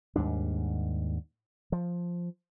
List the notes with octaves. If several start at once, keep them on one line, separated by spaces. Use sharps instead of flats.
D#2 G#2 G3 D4
F3